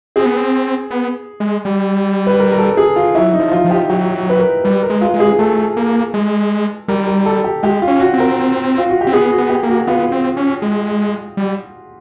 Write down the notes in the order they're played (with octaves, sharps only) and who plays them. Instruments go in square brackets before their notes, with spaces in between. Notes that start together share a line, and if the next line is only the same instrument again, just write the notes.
[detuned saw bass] C4 [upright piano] G#4
[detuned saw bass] B3
C4
B3
G#3
G3
[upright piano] B4
A#4
A#4
A4
G#4
F4
[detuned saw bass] F#3 [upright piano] E4
[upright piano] D#4
[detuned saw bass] F3
[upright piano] F4
[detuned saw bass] F3
[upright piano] G4
[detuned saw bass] F#3 [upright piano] G4
[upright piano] B4
A#4
[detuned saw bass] G3 [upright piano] B4
[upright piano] A#4
[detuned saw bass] G#3
[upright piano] F4
[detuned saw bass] G#3
[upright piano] G#4
G#4
[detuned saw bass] A3 [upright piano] A4
[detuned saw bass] A#3
G#3
[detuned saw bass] G3 [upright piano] A#4
[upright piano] A#4
A4
G4
[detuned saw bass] G#3 [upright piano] G4
[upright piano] F4
[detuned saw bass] C#4
[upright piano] F#4
[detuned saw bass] C4
[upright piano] A#4
F4
F#4
G4
[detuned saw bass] C4
[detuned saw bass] B3 [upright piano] G#4
[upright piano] F#4
[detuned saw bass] B3
[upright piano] G4
[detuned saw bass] A#3
[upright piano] F#4
[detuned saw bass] B3 [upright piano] F4
[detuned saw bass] C4
C#4
G#3
G3